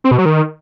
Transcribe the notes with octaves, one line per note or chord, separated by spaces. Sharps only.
C4
B2
F#3
D#3